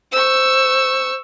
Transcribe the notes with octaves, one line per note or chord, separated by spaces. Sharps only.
C5 C#6 E6